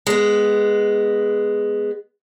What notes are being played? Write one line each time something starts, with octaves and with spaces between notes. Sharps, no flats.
G#3 B3